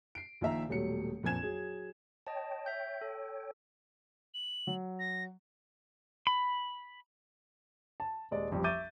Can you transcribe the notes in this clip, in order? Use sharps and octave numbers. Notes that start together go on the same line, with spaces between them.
C7 D7
A#1 A#2 D#3 E5 A#5
D#1 B2 F#3 G3 A3 C#7
A#1 F2 A#3 G#5 G#6 E7
F#3 G#4
C#5 D#5 G5 A5
E5 G6
A4
F#7
F#3
A#6
B5
A5
D#1 G#3 D5 D#5
A1 F2 F3 G3 G4
E5 C#6 D6 G6 A6 D#7